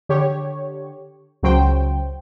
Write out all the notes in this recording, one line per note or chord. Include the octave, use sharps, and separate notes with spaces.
D3 G4 C#5
C#2 C#3 F#3 C5 G5